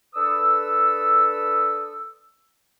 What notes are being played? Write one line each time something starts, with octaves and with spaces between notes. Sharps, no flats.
D4 A4 B4 D#6 E6